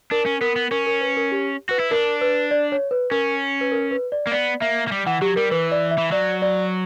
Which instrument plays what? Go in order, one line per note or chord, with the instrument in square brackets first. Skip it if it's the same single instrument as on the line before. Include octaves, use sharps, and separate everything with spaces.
[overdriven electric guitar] D4 [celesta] A#4
[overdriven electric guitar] C#4
[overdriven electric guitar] B3 [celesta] A#4
[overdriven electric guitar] B3
[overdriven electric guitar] C#4 [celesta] A#4
[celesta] A#4
B4
A#4
G4
[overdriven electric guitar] F#4 [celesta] B4
[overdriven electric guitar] E4
[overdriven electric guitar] D4 [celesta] A#4
[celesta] B4
D5
C#5
B4
[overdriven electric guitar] C#4 [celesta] A#4
[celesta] B4
A#4
B4
D5
[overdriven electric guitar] A#3
[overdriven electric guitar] B3 [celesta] D5
[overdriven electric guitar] A#3 [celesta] E5
[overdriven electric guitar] A#3
G3
[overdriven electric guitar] E3 [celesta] F#5
[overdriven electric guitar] F#3 [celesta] G4
[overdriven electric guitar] G3 [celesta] A#4
[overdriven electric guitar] E3 [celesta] B4
[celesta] D5
E5
[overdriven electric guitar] E3
[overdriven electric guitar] F#3 [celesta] D5
[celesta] D5